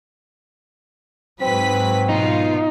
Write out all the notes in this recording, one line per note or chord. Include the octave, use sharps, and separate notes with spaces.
G#2 F#3 C4 B4 B6
B2 D#4 F4